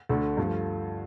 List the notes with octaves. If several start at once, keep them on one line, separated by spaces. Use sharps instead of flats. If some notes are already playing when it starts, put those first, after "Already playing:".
D2 D3 A3 A4
G2 F3 A3